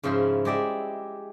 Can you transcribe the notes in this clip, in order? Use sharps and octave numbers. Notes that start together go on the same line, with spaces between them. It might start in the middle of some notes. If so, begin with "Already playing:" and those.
G#2 C#3 F3 E4 C5 E5
G#3 G4 D5 E5